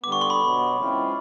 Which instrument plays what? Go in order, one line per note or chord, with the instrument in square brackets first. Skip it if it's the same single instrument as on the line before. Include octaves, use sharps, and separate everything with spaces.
[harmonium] D3 G3 B3 [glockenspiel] D6
[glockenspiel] C#6
C6
B5
[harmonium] B2 F#3 B3
C#3 E3 G#3 C4 F4